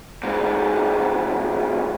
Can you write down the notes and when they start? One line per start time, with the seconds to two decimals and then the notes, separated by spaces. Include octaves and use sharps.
0.23 D2 G#2